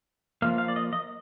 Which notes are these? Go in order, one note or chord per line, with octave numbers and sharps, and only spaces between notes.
F3 A#3 F5
F5
D5
D#5
D#5